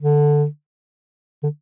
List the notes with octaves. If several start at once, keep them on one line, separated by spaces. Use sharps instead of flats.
D3
D3